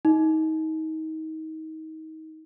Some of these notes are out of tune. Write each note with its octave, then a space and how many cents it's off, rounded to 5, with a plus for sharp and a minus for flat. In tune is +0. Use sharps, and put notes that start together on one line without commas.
D#4 +30